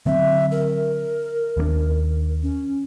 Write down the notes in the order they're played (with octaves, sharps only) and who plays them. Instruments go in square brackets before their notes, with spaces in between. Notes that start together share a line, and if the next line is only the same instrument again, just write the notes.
[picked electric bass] D3 F#3 C4 [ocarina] E5
[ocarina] A#4
[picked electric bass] D#2 A#3 D4
[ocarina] C#4